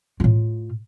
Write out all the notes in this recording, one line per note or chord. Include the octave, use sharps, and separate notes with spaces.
A2 F4